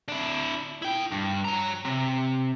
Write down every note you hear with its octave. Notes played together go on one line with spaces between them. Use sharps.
D4 E4
E4 G5
G2
C#5 A#5
C3